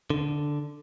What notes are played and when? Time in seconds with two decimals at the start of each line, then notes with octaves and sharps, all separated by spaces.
0.10 D3